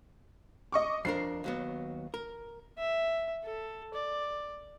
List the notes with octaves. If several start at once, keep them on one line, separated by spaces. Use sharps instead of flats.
D#5 C#6 D6
F2 D4 A#4 C7
D#2 F#3 B3
A#4
E5
A4
D5